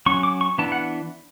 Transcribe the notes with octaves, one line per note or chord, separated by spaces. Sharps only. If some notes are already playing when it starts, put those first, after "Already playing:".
F#3 C#4 C#6
D6
C#6
E3 B3 D4 A5
F#5